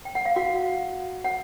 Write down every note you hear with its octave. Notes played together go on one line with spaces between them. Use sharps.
G5
F#5
F5
F#4 F#5
F#5